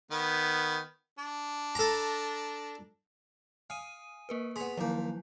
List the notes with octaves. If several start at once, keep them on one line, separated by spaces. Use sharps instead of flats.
D#3 B3
D4
A4 A#5
F5 G#5 D#6 D#7
A#3 A#4 B4
B3 G#4 C6 B6 F7
D#2 F3 F#3 A#3 E4